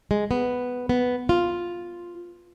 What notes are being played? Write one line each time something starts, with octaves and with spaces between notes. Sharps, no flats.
G#3
B3
B3
F4